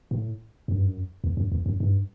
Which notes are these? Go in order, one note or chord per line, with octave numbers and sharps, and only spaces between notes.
A2
F#2
G2
F#2
E2
F#2
E2
F#2
G2